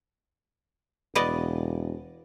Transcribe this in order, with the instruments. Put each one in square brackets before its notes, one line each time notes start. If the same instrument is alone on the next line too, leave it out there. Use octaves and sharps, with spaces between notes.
[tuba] E1 [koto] B3 D5 D#5